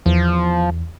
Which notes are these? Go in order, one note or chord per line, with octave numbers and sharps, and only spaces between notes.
E2 F3